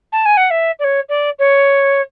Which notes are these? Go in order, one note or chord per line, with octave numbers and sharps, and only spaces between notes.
A5
G#5
F#5
E5
D5
C#5
D5
C#5